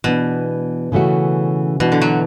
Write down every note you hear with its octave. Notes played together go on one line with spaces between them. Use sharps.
B2 E3 B3 D4
C#3 E3 A3 C#4 F#4
B2 E3 B3 D4 F#4
D3
F#3